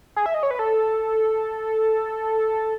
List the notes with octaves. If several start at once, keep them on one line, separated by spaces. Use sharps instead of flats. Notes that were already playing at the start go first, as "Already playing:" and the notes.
G#4
E5
D#5
C#5
B4
A4